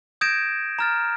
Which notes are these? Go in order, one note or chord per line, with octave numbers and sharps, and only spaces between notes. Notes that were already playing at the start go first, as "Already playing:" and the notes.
D#6 G6 G#6 A#6 D7 E7
A#5 F6 A6